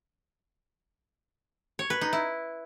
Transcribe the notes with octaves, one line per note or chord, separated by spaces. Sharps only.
C#5
B4
D#4
E4